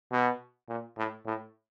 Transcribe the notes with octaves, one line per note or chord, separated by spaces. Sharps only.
B2
A#2
A2
A2